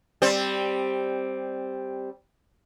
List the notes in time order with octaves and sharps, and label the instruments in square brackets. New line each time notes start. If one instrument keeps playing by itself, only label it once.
[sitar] G3 C4 C5